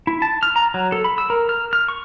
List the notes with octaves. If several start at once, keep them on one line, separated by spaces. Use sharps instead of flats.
E4
A5
F6
A#5
F#3
A4
B5
E6
A#4
F6
F6
C#6